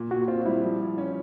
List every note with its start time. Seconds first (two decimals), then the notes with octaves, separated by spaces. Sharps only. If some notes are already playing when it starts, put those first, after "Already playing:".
Already playing: A#2
0.11 A#2 F#4
0.28 C4 F4
0.46 G3 E4
0.63 F3
0.81 F3
0.98 C#4